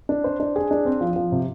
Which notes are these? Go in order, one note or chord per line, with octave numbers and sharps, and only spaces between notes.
D4
C5
D4
G#4
D4
C4
F3
F3
C3